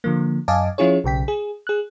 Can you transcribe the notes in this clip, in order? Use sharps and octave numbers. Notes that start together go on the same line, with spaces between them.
D3 F3 A#3
F#2 D#5 F5 G#5 A5 D6
F3 C#4 E4 F4 G#4 C#5
B1 C#3 G5 B6
G#4
G#4 F#6